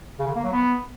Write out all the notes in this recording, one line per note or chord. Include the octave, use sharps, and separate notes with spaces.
C#3
D3
A#3
F#3
B3